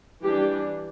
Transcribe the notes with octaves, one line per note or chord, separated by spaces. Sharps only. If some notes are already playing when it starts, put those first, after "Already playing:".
E3 G3 D4 G4